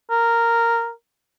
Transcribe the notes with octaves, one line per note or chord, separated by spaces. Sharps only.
A#4